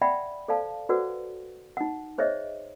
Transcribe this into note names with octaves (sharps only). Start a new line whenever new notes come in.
D5 E5 F#5 G5 B5
A4 C5 D5 F5 A5
F#4 A4 B4 C5 D5 F#5
D#4 F#5
G#4 C5 C#5 D#5 E5